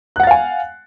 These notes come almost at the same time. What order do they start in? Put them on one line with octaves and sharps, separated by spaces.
F#6 F#5 A6 F5 G#5